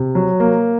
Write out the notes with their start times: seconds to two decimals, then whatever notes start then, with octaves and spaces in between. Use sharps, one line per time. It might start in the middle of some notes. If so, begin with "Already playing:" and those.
Already playing: C3
0.15 F#3
0.40 A#3